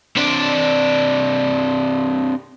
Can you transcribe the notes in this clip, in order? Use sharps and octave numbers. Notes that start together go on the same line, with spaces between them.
C3 D4